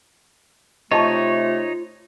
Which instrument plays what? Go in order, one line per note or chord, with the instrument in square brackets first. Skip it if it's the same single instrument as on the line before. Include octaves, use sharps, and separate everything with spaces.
[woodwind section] C3 A3 [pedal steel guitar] D#4 C#5 [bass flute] F4 [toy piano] D#5 A5 C#6